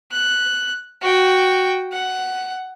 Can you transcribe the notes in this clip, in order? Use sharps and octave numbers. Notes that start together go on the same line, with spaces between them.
F#6
F#4 G5
F#5